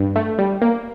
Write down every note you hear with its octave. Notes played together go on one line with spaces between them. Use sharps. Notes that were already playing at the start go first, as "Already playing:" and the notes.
Already playing: G2
A3
G3
A#3